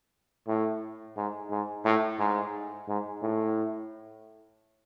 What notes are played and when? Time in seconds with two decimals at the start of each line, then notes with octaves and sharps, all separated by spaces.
0.47 A2
1.17 G#2
1.51 G#2
1.85 A2
2.19 G#2
2.88 G#2
3.22 A2